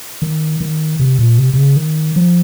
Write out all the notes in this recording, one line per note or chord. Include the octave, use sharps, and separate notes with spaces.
D#3
D#3
C3
A#2
C3
C3
C#3
D#3
F3